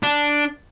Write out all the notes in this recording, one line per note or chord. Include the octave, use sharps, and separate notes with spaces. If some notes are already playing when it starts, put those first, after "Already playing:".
D4